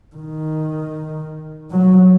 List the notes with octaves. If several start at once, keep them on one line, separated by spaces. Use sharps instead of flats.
D#3
F#3